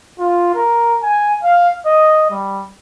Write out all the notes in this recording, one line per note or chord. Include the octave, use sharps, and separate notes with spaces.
F4
A#4
G#5
F5
D#5
G3